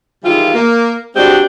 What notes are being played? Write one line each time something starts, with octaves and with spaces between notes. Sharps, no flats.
D#3 E3 G3 G#3 F4
A#3
G3 G#3 C4 D4 F#4 G4